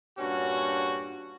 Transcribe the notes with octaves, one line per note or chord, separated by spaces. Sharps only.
G2 A#2 C#4 F#4